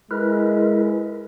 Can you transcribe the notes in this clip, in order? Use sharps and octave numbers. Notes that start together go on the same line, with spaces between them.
G#3 E4 A#4 B4